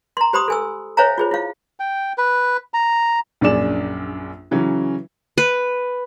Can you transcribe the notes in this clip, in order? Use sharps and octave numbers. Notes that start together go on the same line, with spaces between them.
A#5 C6
G4 C5 B5 C6 D#6
A4 G#5 E6
C5 C#5 E5 F5 G#5 A#5
F4 G#4 C5
E4 F5
G5
B4
A#5
A#1 F#2 D4 G#4 D5 E7
C#3 E3 F#3 C#4
B4